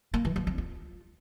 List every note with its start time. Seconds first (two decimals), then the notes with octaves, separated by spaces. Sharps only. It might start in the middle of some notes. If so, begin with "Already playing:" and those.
0.14 A#3
0.25 E3
0.36 F3
0.47 C4
0.58 F4